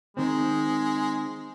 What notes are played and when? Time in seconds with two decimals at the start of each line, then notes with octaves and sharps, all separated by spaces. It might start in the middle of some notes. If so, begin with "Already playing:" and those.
0.17 D#3 G#3 C4